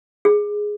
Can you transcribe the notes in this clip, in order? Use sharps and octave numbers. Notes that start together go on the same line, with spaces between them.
G#4